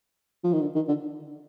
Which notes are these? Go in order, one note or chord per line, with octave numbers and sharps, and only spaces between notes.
F3
D#3
D3
D#3
D3